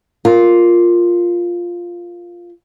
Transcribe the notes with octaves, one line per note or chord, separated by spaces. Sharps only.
F4 A#4